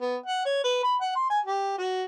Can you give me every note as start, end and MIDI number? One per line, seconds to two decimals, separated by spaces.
0.01 0.16 59
0.26 0.44 78
0.45 0.63 73
0.64 0.79 71
0.83 0.95 83
1.01 1.14 78
1.15 1.26 84
1.30 1.40 80
1.45 1.78 67
1.78 2.04 66